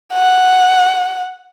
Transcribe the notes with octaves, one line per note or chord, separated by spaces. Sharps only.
F#5